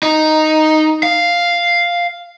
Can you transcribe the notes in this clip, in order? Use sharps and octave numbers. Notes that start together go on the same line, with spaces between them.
D#4
F5